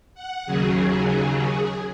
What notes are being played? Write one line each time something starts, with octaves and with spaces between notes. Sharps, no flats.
F#5
D#2 C#3 F#3 G#4
G#4